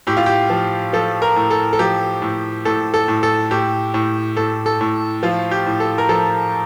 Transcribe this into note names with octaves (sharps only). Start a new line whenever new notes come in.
A2 G4
F4
G4
F3
F3 A4
A#4
A2
A4
A4
F3 G4
A2
A2 A4
A4
A2
A4
A2 G4
A2
A2 A4
A4
A2
F3 F4
G4
A2
A4
A#4
F3 A4